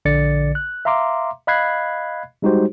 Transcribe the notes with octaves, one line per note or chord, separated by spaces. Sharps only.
A#1 D3 D5 A6 C#7
F#6
E5 F5 A#5 C6 D6
D#5 F5 B5 F#6 G#6 C7
G3 G#3 D#4 F#4 G4 C5